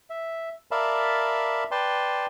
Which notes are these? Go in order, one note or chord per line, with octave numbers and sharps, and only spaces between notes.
E5
A#4 D5 E5 F5 A5 B5
B4 D5 G5 A5 C6